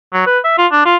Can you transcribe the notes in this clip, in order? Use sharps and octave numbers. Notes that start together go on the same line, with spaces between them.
F#3
B4
E5
F4
D4
F4